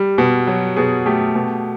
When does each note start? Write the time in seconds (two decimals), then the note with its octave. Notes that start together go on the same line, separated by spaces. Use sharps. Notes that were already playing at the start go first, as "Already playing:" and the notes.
Already playing: G3
0.18 B2
0.47 F#3
0.76 B2 G#4
1.06 A3 G4
1.35 B2